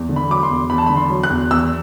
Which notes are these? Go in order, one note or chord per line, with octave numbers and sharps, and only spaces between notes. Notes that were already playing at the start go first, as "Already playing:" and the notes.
Already playing: E2
D3
B5
F#3 D6
C6
E2
E2 B5
A5
D3 B5
C6
F#3
F#6
E2
E2 E6